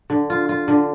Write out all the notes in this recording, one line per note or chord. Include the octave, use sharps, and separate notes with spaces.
D3
F4
F4
D3